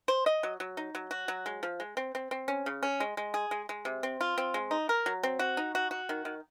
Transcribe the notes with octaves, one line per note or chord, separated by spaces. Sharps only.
C5
D#5
F#3
F#3
D#4
F#3
F#4
F#3
G#3
F3
G#3
C4
C4
C4
C#4
C#3
C#4
G#3
G#3
G#4
G#3
G#3
C3
C4
F4
C4
G#3
D#4
A#4
F#3
C4
F#4
D#4
F#4
F#4
D#3
D#3